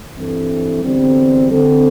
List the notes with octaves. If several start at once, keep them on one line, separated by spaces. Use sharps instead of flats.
G2 E3 C4 A4
E2 D3 G3 C4
D3 C4 A4